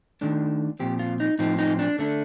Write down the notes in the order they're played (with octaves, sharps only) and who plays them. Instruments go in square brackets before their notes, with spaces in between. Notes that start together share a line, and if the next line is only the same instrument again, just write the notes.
[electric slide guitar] D#3 A3 D4
A#2 F3 C4 G4
F4
D#4
A2 F3 C4 D#4
D#4
D4
D3 A3 D4